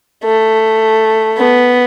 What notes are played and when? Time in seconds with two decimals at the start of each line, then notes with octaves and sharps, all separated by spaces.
0.24 A3
1.38 B3